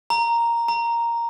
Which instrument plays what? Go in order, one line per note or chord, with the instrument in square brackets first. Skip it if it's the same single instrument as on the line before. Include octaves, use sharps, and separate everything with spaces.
[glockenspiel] A#5
A#5